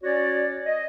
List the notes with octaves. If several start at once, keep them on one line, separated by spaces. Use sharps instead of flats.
C#4 F#4 C#5 D5
D#5